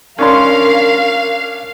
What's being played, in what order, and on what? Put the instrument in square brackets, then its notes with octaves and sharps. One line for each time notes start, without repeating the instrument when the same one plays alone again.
[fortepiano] C#4 D4 C6 [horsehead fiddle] A#4 [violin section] F5